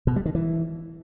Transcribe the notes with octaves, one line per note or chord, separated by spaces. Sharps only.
B2
G3
D#3
E3